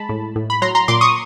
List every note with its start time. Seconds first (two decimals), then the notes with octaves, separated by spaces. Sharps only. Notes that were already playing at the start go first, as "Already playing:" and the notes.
Already playing: G#3 A5 B5
0.09 A2
0.36 A2
0.50 B5
0.62 F#3 A#5 C6
0.75 A#5 C6
0.88 A#2 C6 D6
1.01 C#6 D#6